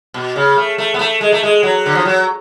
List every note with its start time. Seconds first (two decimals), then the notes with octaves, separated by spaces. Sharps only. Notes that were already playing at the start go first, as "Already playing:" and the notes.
0.14 B2
0.36 C#3
0.56 A3
0.78 A3
0.94 B3
0.99 A3
1.21 G#3
1.32 A3
1.43 G#3
1.63 F#3
1.86 D3
1.95 F3
2.05 F#3